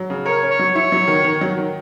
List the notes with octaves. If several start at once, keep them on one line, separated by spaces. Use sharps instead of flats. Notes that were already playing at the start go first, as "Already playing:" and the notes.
Already playing: F#3
C#3
A#4 C#5
C#4
C#5
F#3
E4 C#5
F#3
D#3
D#3
F#3
D#3